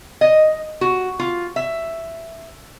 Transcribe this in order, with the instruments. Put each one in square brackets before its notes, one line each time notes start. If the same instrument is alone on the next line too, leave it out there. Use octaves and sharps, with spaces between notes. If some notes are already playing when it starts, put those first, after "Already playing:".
[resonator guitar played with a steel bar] D#5
F#4
F4
E5